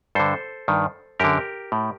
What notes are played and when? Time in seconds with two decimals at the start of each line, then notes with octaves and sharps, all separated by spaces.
0.15 G2 D3 A4 C5
0.68 G2 D#3
1.20 F#2 D3 G4 A#4
1.72 A2